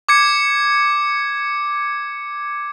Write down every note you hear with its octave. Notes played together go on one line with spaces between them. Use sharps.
D6 G#6 C#7